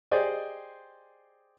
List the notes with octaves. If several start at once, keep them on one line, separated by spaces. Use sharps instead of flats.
G4 G#4 C5 D5 D#5 G#5